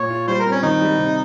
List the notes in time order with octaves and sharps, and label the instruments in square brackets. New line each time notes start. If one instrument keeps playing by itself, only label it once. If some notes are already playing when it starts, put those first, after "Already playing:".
Already playing: [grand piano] A#2 [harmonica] C#5
[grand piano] F4
[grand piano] G3 [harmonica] C5
[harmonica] A#4
[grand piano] C4
[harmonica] C#4
[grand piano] D#3 [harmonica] D#4
[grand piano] G3
C3